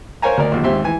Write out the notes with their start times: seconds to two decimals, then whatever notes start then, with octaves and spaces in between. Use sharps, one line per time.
0.22 A#4 C5 C#5 F5 G#5 A#5
0.37 D2 A#4 D5
0.52 A#1 D#2
0.64 D#2 G#2 C4 G4 E5 C6
0.84 E3 G#5